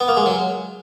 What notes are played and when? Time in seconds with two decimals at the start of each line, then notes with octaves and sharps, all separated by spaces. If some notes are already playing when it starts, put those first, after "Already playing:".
0.01 B3
0.08 A#3
0.17 G#3
0.26 F#3